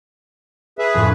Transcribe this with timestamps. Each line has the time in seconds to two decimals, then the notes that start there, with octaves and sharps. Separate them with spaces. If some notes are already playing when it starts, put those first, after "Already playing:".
0.79 G#4 B4 E5
0.94 A#1 F2 A2